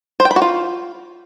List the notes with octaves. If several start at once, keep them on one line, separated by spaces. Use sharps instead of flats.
C5
G5
B5
F#4
F4